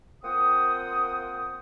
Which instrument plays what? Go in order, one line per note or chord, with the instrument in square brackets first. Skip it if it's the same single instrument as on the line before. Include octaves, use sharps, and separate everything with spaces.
[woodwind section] A#3 C4 F4 F#5 G5 D#6